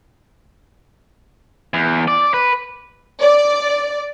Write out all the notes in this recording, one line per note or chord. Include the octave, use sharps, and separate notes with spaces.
E2
D5
B4
D5